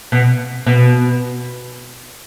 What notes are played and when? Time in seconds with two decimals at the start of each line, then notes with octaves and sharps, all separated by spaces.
0.12 B2
0.66 B2